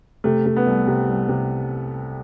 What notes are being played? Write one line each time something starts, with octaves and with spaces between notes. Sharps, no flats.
C3 A3
C3
B3
C2
C3
C2
C3